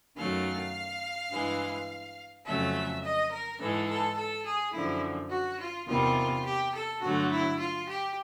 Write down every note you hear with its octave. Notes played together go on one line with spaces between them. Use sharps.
F#2 D#3 F#3 A3 F5
G2 E3 G#3
F2 C#3 F#3 A3 E5
D#5
A#4
G#2 E3 G#3 A4
A4
A4
G#4
F#2 D3 F3 E4
F#4
F4
E2 C3 D#3 G3 F4
G4
A4
G2 D3 F#3 A3 F#4
E4
F4
G4